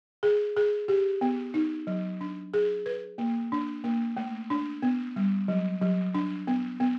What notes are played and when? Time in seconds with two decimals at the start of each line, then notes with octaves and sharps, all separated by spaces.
0.23 G#4
0.57 G#4
0.88 G4
1.21 B3
1.54 D#4
1.87 F#3
2.21 D4
2.54 G#4
2.86 B4
3.18 A#3
3.52 D4
3.84 A#3
4.17 A3
4.50 D4
4.82 B3
5.16 G3
5.48 F#3
5.82 F#3
6.14 D4
6.47 B3
6.80 B3